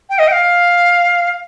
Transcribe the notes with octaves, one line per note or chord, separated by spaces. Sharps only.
G5
D#5
G5
F5